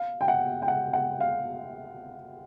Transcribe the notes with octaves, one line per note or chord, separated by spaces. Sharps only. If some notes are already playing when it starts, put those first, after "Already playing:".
Already playing: F5
G5
F#5
G5
F#5
F#5
F5